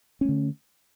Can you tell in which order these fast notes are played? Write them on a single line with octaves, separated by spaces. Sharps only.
C#4 A3 D3